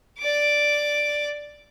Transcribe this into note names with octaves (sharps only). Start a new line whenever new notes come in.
D5 D6